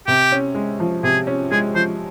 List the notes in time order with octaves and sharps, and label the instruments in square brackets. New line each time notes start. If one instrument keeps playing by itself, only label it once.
[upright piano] C3 [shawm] G4
[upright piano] C#4
G#3
F3
[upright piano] C3 [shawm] G#4
[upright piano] C#4
[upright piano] G#3 [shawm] G#4
[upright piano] F3 [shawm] C5